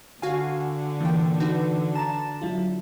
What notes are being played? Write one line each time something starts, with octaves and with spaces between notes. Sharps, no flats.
D3 F#4 F5 G#5
A#2 E3 A#3 G5
D#4 F#4 B4
A5 A#5 A6 E7
F#3 E4 F4